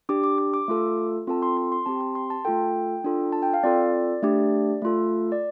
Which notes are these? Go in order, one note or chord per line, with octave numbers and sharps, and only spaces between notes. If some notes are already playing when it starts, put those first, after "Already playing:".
D4 G4 D6
D6
D6
D6
A3 F4 A4
C4 F4 A4 A5
C6
C6
C6
C4 G4 A5
C6
C6
A5
A3 F4 A4 G5
D4 F4 A4
A5
G5
F5
C4 F4 A4 D5
A3 D4 G4
A3 F4 A4
D5